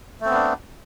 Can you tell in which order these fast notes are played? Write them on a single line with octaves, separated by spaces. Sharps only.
A3 C4 B3 D4